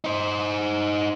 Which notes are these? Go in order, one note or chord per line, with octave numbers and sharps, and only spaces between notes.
D#4 C5